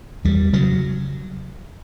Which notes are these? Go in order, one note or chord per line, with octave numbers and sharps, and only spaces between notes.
E2 G3
C#3 F#3